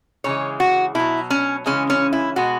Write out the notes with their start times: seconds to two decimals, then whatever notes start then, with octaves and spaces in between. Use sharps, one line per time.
0.24 C#3 E3 G#3 C#5
0.60 F#4
0.95 B2 F#3 E4
1.30 C#4
1.66 C#3 E3 G#3 C#4
1.90 C#4
2.13 E4
2.36 B2 G#3 F#4